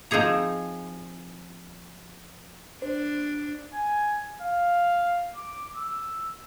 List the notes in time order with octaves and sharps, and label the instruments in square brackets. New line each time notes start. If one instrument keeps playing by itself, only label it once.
[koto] F3 C4 D#4 G#4 A#5
[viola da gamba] D4 [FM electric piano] C5
[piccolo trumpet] G#5
F5
D6
E6